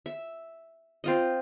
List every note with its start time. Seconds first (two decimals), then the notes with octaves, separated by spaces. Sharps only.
0.06 E5
1.04 C4 F4 D#5